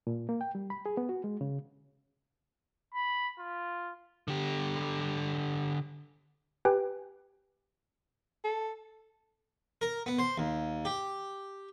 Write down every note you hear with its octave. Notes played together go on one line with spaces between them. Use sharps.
A#2
A#3
G5
G3
B5
G#4
B3
F#4
G#3
C#3
B5
F4
D3 G4
G4 B4 G5 G#5
A4
A#4
B3
C5
D#2
G4